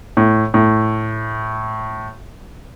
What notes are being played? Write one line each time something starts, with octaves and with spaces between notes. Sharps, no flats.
A2
A2